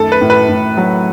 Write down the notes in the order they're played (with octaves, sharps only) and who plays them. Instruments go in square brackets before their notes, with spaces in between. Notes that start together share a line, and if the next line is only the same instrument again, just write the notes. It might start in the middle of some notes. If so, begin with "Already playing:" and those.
Already playing: [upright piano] F#2 D#3 A3 [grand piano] A4
[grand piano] B4
[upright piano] A2
[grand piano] B4
[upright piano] A2
F#3